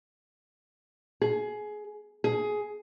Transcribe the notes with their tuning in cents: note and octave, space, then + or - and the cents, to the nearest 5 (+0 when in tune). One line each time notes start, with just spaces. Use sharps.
G#4 +20
G#4 +15